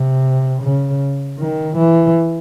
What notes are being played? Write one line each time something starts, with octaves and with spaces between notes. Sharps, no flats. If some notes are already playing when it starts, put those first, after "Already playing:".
Already playing: C3
C#3
D#3
E3